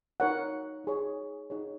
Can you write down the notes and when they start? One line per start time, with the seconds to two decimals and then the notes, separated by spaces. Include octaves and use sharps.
0.20 D#4 A#4 C#5 F#5
0.84 D#4 G#4 C#5
1.50 D#4 G#4 C#5